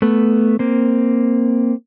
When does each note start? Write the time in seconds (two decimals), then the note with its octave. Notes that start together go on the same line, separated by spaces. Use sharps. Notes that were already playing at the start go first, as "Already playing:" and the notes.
0.02 A3 B3
0.59 A#3 C4